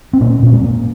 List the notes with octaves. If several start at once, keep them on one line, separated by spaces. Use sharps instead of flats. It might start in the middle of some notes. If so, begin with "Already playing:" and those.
C4
A#2 A#3 C#4
A#2 C#4
G#3 C4
A#2